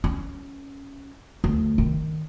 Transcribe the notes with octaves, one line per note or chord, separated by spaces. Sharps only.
C#4
D2
D#3